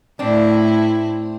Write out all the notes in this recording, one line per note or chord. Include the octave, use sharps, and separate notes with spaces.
A2 A3 C4 D4 E4